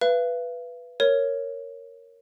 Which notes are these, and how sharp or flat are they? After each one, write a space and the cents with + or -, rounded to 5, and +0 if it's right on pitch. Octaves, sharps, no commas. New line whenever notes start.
B4 +0 F5 -45
A#4 -5 C#5 +0